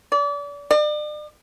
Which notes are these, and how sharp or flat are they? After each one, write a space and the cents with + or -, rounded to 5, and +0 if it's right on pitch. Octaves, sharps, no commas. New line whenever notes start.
D5 -35
D5 +40